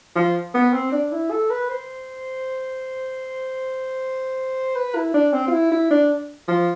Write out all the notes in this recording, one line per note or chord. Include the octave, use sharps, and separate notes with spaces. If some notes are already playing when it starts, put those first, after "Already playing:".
F3
B3
C4
D4
E4
A4
B4
C5
B4
E4
D4
C4
F4
E4
E4
D4
F3